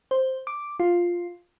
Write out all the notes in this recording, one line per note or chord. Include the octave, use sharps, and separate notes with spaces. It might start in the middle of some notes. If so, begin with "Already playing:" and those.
C5
D6
F4